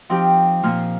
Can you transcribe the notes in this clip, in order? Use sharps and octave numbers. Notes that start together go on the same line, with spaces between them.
F3 C4 D#4 G4
A#2 F3 A#3 F4